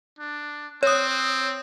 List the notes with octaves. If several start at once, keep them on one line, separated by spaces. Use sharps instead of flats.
D4
C4 C#5 D#6